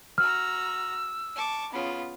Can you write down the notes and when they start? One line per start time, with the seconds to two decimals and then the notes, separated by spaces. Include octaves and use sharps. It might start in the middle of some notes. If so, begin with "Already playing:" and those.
0.18 F#4 A#5 E6 F6
1.36 A5 C#6 D6
1.73 C#3 B3 F4